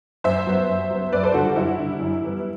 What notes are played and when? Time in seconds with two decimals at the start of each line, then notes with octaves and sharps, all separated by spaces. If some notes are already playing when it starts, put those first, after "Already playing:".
0.24 F#2 C5 E5
0.47 F#3 B3
0.69 F#2
0.90 F#3 B3
1.12 F#2 B4 D5
1.23 A4 C5
1.34 D3 G3 F#4 A4
1.45 F#4
1.56 F#2 E4
1.77 D3 G3
2.00 F#2
2.22 E3 G3 B3